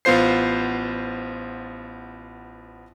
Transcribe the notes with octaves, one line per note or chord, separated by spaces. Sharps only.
A1 B3 F4 C5 C7